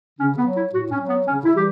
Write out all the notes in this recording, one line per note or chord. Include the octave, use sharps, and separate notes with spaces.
C#3 C#4
B3
F#3
E4
A2 F#4
C#4
F#3
B3
C#3 C#4
E4
E3 G3 G4